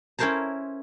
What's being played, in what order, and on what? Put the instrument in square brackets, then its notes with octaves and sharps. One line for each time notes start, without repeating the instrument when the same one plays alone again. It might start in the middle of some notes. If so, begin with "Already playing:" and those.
[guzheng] C#4 E4 A#4 C5 A5 A#5